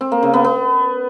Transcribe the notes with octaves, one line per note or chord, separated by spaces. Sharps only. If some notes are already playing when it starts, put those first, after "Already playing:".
C4
A#3
C#3
B3
B3